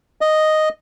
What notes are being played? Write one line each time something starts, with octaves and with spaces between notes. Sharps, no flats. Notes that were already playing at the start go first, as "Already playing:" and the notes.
D#5